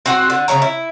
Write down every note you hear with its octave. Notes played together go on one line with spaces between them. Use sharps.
C4 F#4 C5
D3
C#3 G#3 C#5 A#5
E4